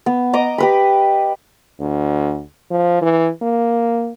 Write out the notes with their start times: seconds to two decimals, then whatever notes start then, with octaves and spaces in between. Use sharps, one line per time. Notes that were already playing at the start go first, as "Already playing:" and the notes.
0.06 B3
0.33 D#5 A#5 D6 D#6
0.58 G4 B4 B5
1.80 D2
2.71 F3
3.02 E3
3.42 A#3